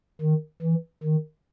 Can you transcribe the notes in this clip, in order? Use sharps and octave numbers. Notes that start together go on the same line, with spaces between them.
D#3
E3
D#3